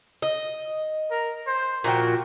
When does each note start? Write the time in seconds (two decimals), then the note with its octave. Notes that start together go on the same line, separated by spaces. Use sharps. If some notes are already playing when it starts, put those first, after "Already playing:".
0.22 D#5
1.11 A#4
1.47 C5
1.84 A#2 F3 F#4 G5